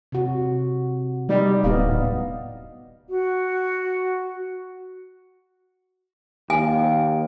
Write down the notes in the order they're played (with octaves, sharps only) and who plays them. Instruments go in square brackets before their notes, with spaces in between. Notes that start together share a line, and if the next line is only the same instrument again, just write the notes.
[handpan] C3 F#4
[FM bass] G3 [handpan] D#4 D5 D#5
[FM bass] D1 [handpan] B3 D#5 F5
[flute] F#4
[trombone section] D#2 [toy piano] G#5